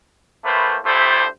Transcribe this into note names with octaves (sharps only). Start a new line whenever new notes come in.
A2 A3 A#3 B4 C5
D2 G2 A3 E4 G4 C5